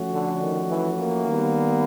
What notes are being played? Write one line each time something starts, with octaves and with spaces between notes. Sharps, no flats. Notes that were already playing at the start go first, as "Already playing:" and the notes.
Already playing: F3 A3 C#4 F#4
D3
D#3
E3
A#3
D#3 G3 B3